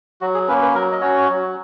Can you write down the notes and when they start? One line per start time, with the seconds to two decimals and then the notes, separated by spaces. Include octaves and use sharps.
0.21 F#3 F#4
0.34 G#4
0.48 A#3 C#4 B4
0.62 B4
0.75 F#3 A#4
0.92 D#5
1.01 C#4 F#4 C#5
1.29 F#3